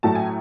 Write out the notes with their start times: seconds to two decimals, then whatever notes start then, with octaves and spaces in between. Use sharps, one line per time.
0.03 A2 F#3 A3 A5
0.15 G#5